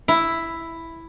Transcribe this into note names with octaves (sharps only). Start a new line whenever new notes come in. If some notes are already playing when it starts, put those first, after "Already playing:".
E4